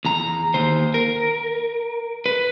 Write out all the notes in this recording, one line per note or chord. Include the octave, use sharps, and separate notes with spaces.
E2 A#5
D#2 C5
A#4
B4